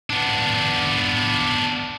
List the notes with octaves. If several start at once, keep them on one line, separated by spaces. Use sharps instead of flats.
B3 D4